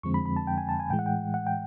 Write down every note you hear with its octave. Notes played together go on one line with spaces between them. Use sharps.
F2 D3 F3 G#3 C4 C#6
B5
B5
A5
G5
G#5
A5
G#5
A2 E3 G#3 G5
F#5
G5
F#5
G5